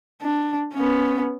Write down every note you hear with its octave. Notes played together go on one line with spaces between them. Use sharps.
D4
B3 C#4